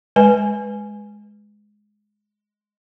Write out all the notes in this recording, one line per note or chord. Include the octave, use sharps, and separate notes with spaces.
G#3 B4 G#5